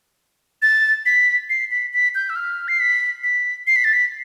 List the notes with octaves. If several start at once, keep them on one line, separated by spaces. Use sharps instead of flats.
A6
B6
C7
B6
B6
G6
E6
F6
C7
B6
B6
C7
B6
A6
B6